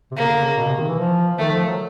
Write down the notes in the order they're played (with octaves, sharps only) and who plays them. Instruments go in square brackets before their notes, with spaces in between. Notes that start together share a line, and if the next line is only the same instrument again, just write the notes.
[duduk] C3
[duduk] C#3 [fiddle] A#3
[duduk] D3
C#3
B2
C3
D#3
E3
F3
[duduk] D#3 [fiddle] A3
[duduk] F3
F#3